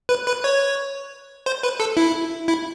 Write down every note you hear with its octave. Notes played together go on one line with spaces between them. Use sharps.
B4
B4
C#5
C5
B4
A4
E4
E4